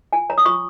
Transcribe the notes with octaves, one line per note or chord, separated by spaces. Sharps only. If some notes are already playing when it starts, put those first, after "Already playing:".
F4 G#5
C#5 A#5
D#6
F4 C#6